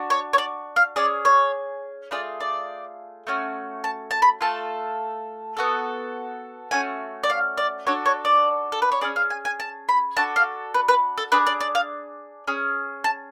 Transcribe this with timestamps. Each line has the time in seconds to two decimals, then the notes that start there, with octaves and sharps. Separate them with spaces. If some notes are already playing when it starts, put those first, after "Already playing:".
Already playing: D4 F#4
0.10 C#5
0.33 C#5
0.38 D5
0.76 F5
0.96 C#4 G#4 D5
1.25 C#5
2.11 A3 F4 G#4 D5
2.41 D5
3.27 A3 C#4 F#4
3.84 A5
4.11 A5
4.22 B5
4.41 A3 F4 A4 A5
5.57 B3 F#4 A4
6.71 A3 C#4 F#4 G#5
7.24 D5
7.30 F5
7.57 D5
7.87 D4 F#4 A4 C#5
8.06 C#5
8.25 D5
8.72 A4
8.82 B4
8.92 C#5
9.01 C#4 G#4 D5
9.16 F5
9.30 G#5
9.45 G#5
9.60 A5
9.89 B5
10.17 D4 F#4 A4 A5
10.36 F5
10.74 B4
10.88 B4
11.18 A4
11.32 D4 G#4 B4
11.47 D5
11.61 D5
11.75 F5
12.48 C#4 G#4
13.04 A5